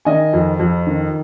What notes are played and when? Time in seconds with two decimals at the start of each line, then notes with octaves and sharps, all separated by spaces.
0.05 D#3 D#5 G#5
0.33 F2
0.59 F2
0.87 D#3